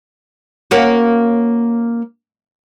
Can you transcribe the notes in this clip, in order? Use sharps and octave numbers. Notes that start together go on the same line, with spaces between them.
A#3 C#4 F#4